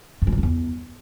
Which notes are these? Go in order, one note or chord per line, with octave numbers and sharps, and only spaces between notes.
F#2
G3
G2
F2
E2